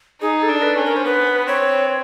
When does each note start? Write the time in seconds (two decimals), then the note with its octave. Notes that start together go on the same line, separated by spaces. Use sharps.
0.21 D#4 G#4
0.43 A4
0.49 D4
0.63 B4
0.77 C#4
0.85 A#4
0.96 C5
1.05 B3 B4
1.47 C4 C#5